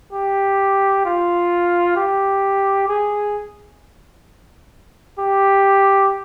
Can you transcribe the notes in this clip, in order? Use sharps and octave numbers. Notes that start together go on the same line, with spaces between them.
G4
F4
G4
G#4
G4